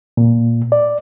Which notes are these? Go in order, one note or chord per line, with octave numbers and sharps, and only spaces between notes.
A#2
D5